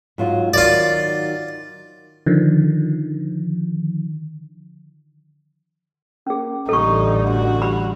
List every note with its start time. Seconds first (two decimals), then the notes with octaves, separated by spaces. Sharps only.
0.18 G#2 F#3 F4
0.54 D#3 F#3 F4 D5
2.26 D3 D#3 F3
6.27 A#3 C#4 G#4
6.69 A1 D3 G3 D#4 A4 C#6
7.30 F#4
7.62 G3 B5